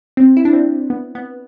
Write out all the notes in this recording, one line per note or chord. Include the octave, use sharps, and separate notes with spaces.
C4
E4
D4
C4
B3
B3